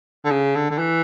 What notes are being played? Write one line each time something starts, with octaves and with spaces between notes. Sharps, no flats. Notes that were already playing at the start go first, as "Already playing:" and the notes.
D3
C#3
D3
D3
E3